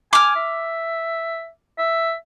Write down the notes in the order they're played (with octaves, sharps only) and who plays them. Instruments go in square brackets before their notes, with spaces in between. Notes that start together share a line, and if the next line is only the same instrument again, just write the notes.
[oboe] G#5 [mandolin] D6 F6
[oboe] E5
E5